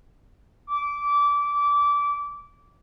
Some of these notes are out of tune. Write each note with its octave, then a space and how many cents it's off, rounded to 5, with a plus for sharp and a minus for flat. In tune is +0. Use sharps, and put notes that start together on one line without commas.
D6 -20